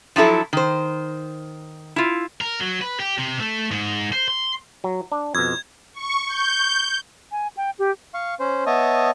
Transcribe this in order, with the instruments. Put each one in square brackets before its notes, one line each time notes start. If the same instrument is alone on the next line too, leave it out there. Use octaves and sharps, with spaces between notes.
[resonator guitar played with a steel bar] F3 F#3 E4 A4
D#3 C5
E4 F4
[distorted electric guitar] A#4
F#3
B4
G4
C3
A3
G#2
C5
C6
[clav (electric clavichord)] F#3
D4
[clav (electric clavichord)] F2 B2 [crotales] G#6
[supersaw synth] C#6
G6
[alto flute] G#5
G5
G4
[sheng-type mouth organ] F5 C#6
C#4 C5
B3 C#5 D#5 E5 A5 D#6